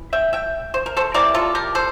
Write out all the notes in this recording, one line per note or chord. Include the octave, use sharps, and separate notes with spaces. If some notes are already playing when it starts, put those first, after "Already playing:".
Already playing: E3
E5 G5
E5 G5
C5
A#4
A4 C5
C3 E3 A#3 A#4 D5
F4 A4
G4 A#4
A4 C5